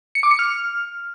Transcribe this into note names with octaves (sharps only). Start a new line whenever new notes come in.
C#7
D6
C#7
F6